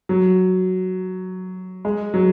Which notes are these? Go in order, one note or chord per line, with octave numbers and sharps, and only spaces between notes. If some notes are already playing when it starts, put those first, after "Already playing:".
F#3
G#3
F#3